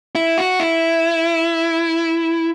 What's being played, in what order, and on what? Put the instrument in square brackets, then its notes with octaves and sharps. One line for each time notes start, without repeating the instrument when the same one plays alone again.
[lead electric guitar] E4
F#4
E4